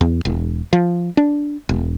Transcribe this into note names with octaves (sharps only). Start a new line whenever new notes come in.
E2
E1
F3
D4
E1